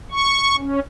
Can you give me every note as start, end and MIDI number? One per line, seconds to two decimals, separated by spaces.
0.11 0.56 85
0.57 0.80 61